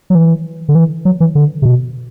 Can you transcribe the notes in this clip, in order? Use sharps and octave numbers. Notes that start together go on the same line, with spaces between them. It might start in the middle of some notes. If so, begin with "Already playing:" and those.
F#3
E3
D3
E3
F#3
E3
D3
C3
B2